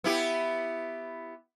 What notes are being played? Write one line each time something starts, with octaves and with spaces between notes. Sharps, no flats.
B3 E4 G4